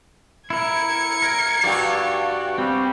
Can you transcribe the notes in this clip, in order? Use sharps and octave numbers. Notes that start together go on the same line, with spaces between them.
E4 A#4 G#6 C#7
A#4
G2 F#4 G4 D5
G3 C4